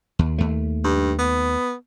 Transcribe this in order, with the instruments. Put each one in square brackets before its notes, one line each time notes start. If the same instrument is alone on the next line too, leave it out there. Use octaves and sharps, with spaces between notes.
[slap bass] D#2
D#2 A3
[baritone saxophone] G2
B3